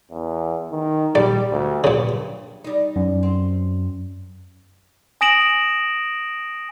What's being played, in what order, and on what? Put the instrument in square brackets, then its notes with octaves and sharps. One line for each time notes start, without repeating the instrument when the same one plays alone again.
[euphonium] E2
D#3
[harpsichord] A#1 D5 [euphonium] G3
[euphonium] D2
[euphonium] G2 [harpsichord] A#2 C#3
[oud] G3 D#4
[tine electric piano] F#2
[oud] C4
[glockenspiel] G#5 D#6 A#6 D7 E7 F#7